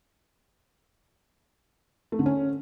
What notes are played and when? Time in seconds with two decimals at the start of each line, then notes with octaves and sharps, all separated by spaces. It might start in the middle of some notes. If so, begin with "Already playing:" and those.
2.12 A3
2.19 D3
2.26 C#4